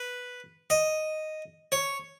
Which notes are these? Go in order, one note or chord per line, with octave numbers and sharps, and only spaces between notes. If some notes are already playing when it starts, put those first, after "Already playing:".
Already playing: B4
D#5
C#5